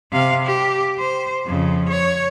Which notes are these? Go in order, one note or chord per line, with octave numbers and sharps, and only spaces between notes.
C3 F5
G4
C5
F2 C#3
C#5